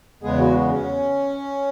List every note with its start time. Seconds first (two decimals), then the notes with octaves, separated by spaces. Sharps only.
0.23 E2 C#3 G#3 B3 G#4
0.39 F#4
0.53 B3
0.69 C#4